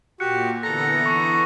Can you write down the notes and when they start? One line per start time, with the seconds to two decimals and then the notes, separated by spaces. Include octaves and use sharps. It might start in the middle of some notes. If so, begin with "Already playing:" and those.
0.20 A#2 F#4 G4 F#6 C#7
0.63 D3 E3 B3 A4 A#5 A#6
1.06 C#6